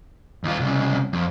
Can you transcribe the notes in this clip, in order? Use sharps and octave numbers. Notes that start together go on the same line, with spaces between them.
D#2 F4
C2 C#3
F2